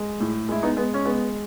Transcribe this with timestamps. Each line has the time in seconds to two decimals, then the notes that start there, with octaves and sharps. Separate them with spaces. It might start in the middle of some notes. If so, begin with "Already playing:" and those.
Already playing: G#3
0.20 A2
0.49 G#3 E4
0.63 B3 D#4
0.77 G#3 B3
0.94 C#4
1.05 G#3 B3